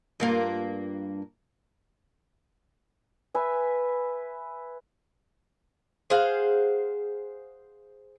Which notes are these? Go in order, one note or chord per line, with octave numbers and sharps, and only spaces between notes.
G2 A#3 F4
B4 E5 G#5
G#4 C5 F5 F#5